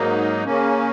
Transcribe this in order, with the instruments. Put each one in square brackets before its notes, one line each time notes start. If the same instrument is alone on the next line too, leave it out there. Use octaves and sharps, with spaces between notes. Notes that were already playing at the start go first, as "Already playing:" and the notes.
Already playing: [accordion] G#2 F#3 A#3 D#4
C#3 A#3 C#4